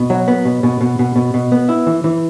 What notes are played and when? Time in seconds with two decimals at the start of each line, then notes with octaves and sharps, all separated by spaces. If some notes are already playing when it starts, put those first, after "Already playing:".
Already playing: B2
0.10 F#3
0.28 B3
0.45 B2
0.63 B2
0.81 B2
0.99 B2
1.16 B2
1.34 B2
1.52 B3
1.69 E4
1.87 E3
2.04 E3